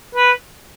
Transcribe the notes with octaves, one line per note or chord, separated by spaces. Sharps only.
B4